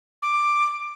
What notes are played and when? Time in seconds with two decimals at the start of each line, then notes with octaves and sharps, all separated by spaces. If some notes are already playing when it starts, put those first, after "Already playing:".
0.22 D6